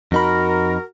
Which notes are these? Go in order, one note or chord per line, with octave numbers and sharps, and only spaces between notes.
F2 D#4 F#4 A#4 B5